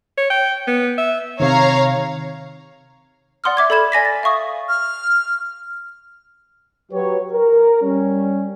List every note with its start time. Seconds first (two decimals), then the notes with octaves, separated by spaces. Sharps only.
0.17 C#5
0.30 G5
0.67 B3
0.98 E5
1.40 C3 D#3 C#5 F5 A#5
3.44 D5 F#5 C6 D#6 F6
3.57 E5 D6 G#6
3.70 A4 D5 B5 G#6 E7
3.92 D5 G#5 A#6 B6
4.05 A6
4.23 E5 F5 C#6 D#6
4.69 F6
6.92 F#3 G4 B4 C#5
7.32 A#4
7.82 G3 C#4